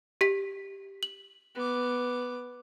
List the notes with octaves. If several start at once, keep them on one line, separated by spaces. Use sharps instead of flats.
G4 B6
F#7
B3 D6